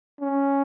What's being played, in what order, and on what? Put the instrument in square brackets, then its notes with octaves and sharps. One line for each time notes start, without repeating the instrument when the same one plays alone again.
[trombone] C#4